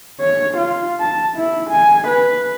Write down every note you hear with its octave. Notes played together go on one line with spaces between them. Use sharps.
C#5
F4
A5
E4
G#5
B4